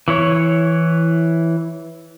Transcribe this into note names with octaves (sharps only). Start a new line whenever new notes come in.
E3 E4 C#5